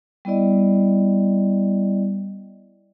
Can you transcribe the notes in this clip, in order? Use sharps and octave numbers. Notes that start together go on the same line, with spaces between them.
G3 B3 E4 D5 D#5